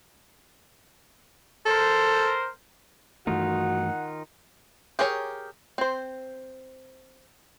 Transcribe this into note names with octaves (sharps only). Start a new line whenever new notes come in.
A4 A#4 C5
G2 D#3 E3 A3 D#4 F4 F#4 F#5
G4 G#4 A#4 C#5
C4 C5